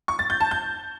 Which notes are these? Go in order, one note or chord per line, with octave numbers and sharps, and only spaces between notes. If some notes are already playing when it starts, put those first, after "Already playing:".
C#6
A6
G6
A5
G6